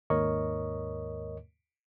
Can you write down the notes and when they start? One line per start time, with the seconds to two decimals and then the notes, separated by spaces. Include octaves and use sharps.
0.10 D#2 G#2 A#4 C#5 D#5 C#6